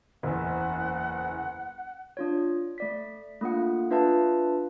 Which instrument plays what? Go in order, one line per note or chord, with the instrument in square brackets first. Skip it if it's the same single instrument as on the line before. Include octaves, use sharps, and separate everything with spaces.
[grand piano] F#1 E2 [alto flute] F#5
[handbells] D4 F4 C#5
A3 D5 B6
A3 A#3 D4 F4 F#5
D4 F4 B4 E5 F5 A5